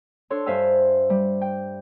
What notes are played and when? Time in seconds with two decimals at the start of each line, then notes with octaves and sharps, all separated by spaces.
0.30 D4 A4 C#5 C6
0.46 G2 C5 E5 F5 G#5 E6
1.10 G3
1.41 G5